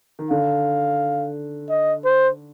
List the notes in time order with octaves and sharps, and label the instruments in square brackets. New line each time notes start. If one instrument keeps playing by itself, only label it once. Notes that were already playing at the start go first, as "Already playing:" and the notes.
[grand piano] D#3
[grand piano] D3 [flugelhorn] F5
[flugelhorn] D#5
C5